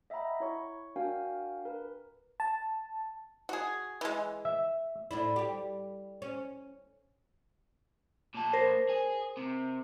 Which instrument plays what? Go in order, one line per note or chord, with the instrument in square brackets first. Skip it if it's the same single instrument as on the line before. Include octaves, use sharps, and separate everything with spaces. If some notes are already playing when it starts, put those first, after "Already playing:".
[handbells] D#5 E5 F#5 G5 A#5 B5
E4 C#5 C#6
D4 F#4 A#4 F5 G5 G#5
A#4 B4
[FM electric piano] A5
[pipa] F#4 G#4
E3 G#3
[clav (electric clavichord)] E5
[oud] A2 D4 E4
G3 G4
C#4
[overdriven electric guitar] A#2 A5
[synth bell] A#4 C5
[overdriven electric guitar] G#4
C3